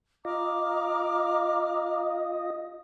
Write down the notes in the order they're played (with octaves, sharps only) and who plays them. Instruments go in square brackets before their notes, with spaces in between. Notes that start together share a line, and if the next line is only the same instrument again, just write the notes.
[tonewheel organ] F4 D#5 [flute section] A#5 D6 F6